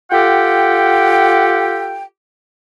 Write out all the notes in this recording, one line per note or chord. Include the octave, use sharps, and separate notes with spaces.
F4 G4 A4 F#5 G5